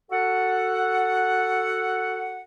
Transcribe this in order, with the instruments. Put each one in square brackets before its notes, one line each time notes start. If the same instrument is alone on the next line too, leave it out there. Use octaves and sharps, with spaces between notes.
[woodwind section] F#4 A4 F#5